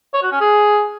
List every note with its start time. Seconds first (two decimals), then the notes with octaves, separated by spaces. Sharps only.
0.14 C#5
0.23 F#4
0.32 C#4
0.41 G#4